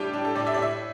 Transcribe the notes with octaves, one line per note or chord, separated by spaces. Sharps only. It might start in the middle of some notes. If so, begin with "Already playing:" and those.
Already playing: A2 G3 D4 G4
D4
A4
A2 D5
E5
D5
A2 E5